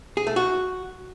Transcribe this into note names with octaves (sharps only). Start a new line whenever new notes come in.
G#4
A3
F#4